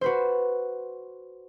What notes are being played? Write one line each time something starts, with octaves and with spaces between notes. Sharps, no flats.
F#4 B4 C5